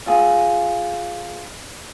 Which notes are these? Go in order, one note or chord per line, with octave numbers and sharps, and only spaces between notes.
F4 G#4